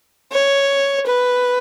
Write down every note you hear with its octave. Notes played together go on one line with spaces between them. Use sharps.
C#5
B4